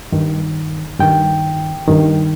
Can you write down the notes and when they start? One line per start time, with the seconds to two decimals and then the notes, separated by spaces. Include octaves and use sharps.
0.12 G2 D#3
1.00 G2 D#3 G5
1.88 G2 D#3